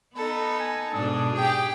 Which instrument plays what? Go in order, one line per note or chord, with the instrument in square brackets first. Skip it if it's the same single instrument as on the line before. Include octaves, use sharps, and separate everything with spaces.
[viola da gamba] B3 [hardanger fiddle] D#4 A4 [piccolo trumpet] B5
[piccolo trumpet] G#5
[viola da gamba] G#2 B2 [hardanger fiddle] D4 [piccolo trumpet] D#6
[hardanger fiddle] G4 G5 [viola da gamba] G#4